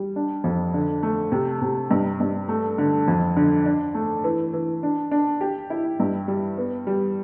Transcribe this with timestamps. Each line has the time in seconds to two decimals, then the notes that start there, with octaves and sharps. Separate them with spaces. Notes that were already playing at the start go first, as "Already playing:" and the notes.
Already playing: G3
0.16 D4
0.44 F2
0.74 D3
1.03 A3
1.32 C3
1.61 C3
1.91 G2
2.20 G2
2.48 A3
2.78 D3
3.08 F2
3.37 D3
3.66 D4
3.94 A3
4.24 E3
4.53 E3
4.83 D4
5.11 D4
5.41 G4
5.70 E4
6.00 G2
6.28 G3
6.58 B3
6.87 G3